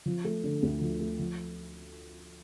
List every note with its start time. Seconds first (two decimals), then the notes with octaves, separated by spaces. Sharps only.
0.06 F3
0.25 A3
0.44 D3
0.62 D2
0.81 F3
1.01 A3
1.19 F3